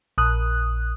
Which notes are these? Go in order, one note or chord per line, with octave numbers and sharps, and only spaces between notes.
A#1 D#6 F#6